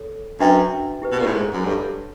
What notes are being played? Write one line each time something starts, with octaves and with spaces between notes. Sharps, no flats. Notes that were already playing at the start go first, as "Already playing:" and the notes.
Already playing: A4 C#5
F#2 D4 F#4 B4 E5 G5
E4 G4 B4
B2
A#2
A2
G#2
F#2
G2 A4 C#5 F#5 A5